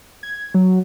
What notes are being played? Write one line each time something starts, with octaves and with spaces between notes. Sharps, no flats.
G#6
F#3